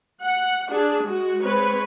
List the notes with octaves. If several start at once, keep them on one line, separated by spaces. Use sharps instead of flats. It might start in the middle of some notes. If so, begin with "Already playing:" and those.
F#5
D4 G#4
G#3 F#4
G#3 C4 B4 C#5